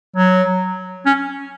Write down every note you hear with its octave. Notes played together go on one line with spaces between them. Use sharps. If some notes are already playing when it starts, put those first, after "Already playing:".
F#3
C#4